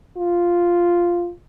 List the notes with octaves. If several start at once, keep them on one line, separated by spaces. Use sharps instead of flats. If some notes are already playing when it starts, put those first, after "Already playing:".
F4